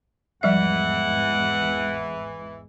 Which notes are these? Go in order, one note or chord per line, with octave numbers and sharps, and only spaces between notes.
G#1 E2 E3 F3 G3 G#3 E5 F#5